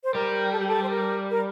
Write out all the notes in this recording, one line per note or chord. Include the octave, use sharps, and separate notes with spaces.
C5
G3 A#4
A4
G4
A4
C5
A#4
A#4